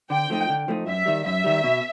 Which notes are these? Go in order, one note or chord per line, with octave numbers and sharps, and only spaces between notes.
D3 G5
F3 A3 C4 D#4
D3
F3 A3 C4 D#4
F#2 E5
D#3 G3
F#2 E5
D#3 G3
B2